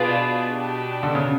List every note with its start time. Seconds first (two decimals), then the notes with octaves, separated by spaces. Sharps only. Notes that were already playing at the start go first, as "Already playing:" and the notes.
Already playing: B2 D4 F4 G#4 B4 D5
0.51 D4 G4 B4
1.03 D3
1.15 C#3